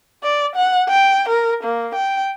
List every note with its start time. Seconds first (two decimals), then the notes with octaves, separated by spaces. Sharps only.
0.23 D5
0.56 F#5
0.89 G5
1.29 A#4
1.63 A#3
1.95 G5